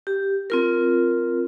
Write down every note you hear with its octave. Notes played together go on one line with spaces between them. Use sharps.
G4
C4 F4 A#4